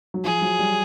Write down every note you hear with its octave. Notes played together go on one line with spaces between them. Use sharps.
F#3
F3 G#4
F#3
G3